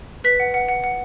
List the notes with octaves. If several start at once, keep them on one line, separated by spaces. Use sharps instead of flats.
B4 B6
F#5
F#5
F#5
F#5